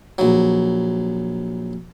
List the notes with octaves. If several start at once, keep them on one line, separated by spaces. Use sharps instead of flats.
A#1 F#3